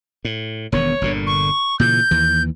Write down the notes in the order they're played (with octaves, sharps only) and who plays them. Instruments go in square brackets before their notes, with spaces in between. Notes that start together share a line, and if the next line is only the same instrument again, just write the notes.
[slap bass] A2
[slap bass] E1 D#3 B3 [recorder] C#5
[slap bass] G1 A#2 D3
[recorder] C#6
[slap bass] A#2 C#3 E3 [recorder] G6
[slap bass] D#2 E3